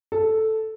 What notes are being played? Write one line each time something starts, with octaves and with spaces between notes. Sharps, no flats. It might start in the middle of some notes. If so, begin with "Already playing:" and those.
A4